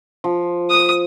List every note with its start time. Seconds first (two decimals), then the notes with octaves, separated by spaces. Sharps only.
0.24 F3
0.70 D#6